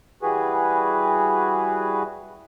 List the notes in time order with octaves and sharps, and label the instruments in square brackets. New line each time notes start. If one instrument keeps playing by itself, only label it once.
[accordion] E3 G3 F#4 G#4 B4